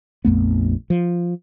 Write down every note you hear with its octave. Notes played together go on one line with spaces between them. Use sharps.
A#1 F2 A3 B3
F3